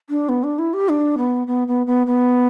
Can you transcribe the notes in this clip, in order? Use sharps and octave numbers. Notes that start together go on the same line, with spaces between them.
D4
B3
D4
E4
G4
D4
B3
B3
B3
B3
B3